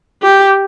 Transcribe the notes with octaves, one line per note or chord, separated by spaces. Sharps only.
G4